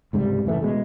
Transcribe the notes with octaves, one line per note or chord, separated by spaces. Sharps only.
C#2 G#2 C3 G3
F1 C#3 E3 A3
B2 G#3